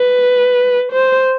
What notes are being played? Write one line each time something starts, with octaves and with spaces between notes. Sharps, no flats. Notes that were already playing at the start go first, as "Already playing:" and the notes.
Already playing: B4
C5